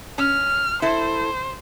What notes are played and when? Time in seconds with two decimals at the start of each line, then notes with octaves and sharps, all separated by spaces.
0.18 C#4 F6
0.82 E4 A4 C5